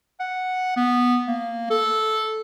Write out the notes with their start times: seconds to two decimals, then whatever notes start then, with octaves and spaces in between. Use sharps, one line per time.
0.20 F#5
0.76 B3
1.28 A#3
1.70 A4